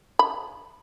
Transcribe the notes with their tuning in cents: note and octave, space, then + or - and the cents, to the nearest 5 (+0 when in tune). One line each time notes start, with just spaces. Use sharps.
B5 -10